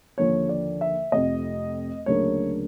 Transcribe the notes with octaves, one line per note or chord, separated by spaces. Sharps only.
D#2 D3 F3 C#5
D5
E5
F1 F2 C3 D#5
D2 C#3 F#3 A#3 D4 C#5